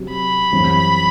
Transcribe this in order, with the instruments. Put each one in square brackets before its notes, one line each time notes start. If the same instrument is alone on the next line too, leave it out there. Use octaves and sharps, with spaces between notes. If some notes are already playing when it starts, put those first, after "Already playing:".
Already playing: [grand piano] C3 F#3 C4
[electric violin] B5
[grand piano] F#2 E3 G3 C4